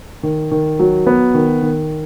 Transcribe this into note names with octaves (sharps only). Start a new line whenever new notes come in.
D#3
D#3
F#3
B3
D#3
D#3